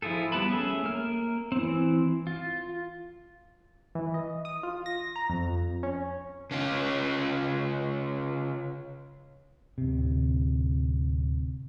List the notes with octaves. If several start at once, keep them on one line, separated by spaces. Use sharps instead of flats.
F3 E4 F4 G#4 A4
G3 B3 B4 A5 B5
A3 C#4 G#4 E5
A#3 F6
E3 C4
F4
E3
D#5
D#6
F4
A#6
A#5
F2
C#4
C#3 C#4 F4
D1 C3